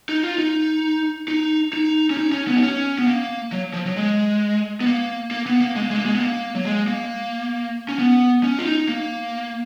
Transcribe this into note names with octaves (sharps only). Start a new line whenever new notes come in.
D#4
F4
D#4
D#4
D#4
C#4
D#4
C#4
B3
D#4
C#4
B3
A#3
F#3
F3
F#3
G#3
B3
A#3
A#3
B3
A#3
G#3
A#3
G#3
A#3
G#3
B3
A#3
F#3
G#3
A#3
C#4
B3
C#4
F4
D#4
A#3